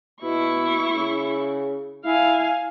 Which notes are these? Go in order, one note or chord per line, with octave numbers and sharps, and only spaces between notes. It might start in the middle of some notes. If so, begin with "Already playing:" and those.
B2 E4 C#6
C#3
E4 F5 G#5